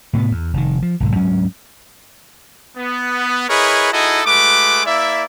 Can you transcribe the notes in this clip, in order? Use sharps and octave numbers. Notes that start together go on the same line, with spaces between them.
A2 C3 A#3 B3
E2
F1 D#3
F3
B1 G#2 D3
D2 G#2 F#3 C#4
B3
E4 G#4 A#4 B4 C#5 D#5
D#4 E4 F#4 G#4 A4 D#5
G#3 A3 F#4 B4 D6
A#3 E4 D5 E5